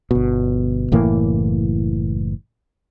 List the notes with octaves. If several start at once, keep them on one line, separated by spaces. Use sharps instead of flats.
G1 B2
F#1 A2 E3 A#3